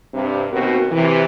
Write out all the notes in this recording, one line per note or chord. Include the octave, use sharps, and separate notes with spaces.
G2 C3
D#2 B2 C4 F#4 A#4
C3 E3